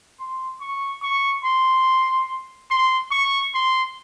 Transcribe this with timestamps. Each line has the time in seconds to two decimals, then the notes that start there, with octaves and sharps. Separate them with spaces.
0.19 C6
0.61 C#6
1.03 C#6
1.44 C6
2.71 C6
3.11 C#6
3.54 C6